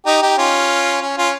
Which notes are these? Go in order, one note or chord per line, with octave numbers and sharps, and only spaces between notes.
D#4 G4
D#4 G4
C#4 F4
C#4
C#4 F4